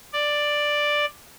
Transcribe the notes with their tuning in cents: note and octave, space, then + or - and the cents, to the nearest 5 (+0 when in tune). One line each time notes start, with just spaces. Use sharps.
D5 +5